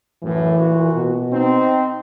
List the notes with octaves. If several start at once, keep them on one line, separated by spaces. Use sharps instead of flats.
F#2 A2 E3
A#2 F#4
B2
C4 D#4